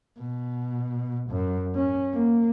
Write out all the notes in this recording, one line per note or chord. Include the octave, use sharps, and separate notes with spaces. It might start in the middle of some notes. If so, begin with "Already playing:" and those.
B2
F#2
C#4
A#3